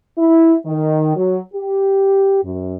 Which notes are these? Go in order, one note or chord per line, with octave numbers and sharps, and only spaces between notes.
E4
D#3
F#3
G4
F#2